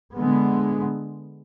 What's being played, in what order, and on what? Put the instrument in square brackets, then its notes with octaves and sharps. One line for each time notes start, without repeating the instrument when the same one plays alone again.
[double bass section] D3 G#3 B3